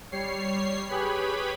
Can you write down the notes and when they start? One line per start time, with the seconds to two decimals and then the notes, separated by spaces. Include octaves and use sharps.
0.12 G3 C#5 C7
0.89 G4 G#4 B4 C#5 B5